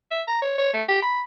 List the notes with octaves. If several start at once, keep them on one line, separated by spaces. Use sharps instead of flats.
E5
A#5
C#5
C#5
A3
G4
B5